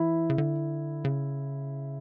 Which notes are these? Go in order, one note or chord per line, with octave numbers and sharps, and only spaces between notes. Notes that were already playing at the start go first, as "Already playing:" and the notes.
Already playing: E3 E4
C#3
D3
C#3